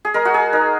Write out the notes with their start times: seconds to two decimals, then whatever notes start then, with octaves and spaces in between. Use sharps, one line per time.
0.05 G#4
0.14 G#3 A#4
0.25 F#4
0.34 G#4
0.53 D#4 A#4